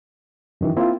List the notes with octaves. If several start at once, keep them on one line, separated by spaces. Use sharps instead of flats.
F#2 D#3 E3
A#3 C4 E4 F4